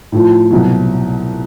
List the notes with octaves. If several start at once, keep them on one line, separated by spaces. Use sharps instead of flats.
A2 F3
C2 B2 F#3